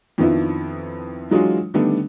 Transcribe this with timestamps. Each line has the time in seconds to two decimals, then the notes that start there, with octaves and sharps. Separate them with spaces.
0.18 F2 D#3 F3 B3 D4 E4
1.31 E3 F#3 G#3 D4 F4 F#4
1.74 D3 D#3 G3 A3 B3 D4